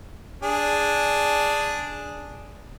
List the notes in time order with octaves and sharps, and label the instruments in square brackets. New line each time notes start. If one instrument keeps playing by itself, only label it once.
[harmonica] D4 G#4